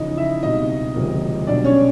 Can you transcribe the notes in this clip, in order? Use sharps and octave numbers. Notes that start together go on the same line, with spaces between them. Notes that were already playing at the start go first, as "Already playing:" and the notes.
Already playing: E2 C#3 F3 D#4 D#5
E4 E5
C#2 B2 G3 C4 D#4 D#5
E1 D2 C3 F3 A#3
B1 B2 G3 D4 D5
C#4 C#5